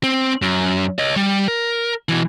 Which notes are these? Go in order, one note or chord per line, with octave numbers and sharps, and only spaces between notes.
C4
F#2
C#5 D#5
G3
A#4
B2 E3